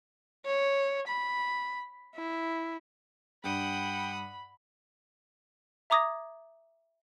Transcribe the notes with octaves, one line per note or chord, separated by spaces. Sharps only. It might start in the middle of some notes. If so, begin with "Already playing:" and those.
C#5
B5
E4
G2 F#5 G5 B5 D#6
E5 A#5 D6 D#6 G#6 A#6